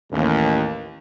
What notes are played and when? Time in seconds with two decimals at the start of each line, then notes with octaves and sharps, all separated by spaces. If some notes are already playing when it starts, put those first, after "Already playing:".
0.11 A1 D#2